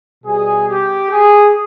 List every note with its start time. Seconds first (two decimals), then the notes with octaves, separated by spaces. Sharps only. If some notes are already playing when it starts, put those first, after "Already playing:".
0.24 B2 G3 G#4
0.68 G4
1.10 G#4